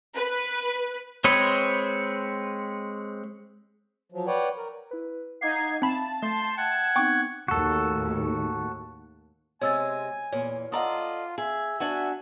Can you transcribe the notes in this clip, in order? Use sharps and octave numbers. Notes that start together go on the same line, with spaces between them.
B4
G#3 C4 B4 C#5
F3 F#3
B4 C#5 D5 F#5 G5
A#4
E4 B4
D#4 F5 F#5 D6 G#6 C7
C4 E5 F5 A5 B5
A3 C6 G6
E5 F#5 G5 G#6
B3 C4 D#4 G5 C#6 D6
D#2 A2 D#3 F#4 A4
C3 G#3 C#5 G#5 E6 A6
E2 A#2 C#5
F4 A4 D5 D#5 F#5 A#5 D#6
G#4 E5
D4 F#4 F#5 G#5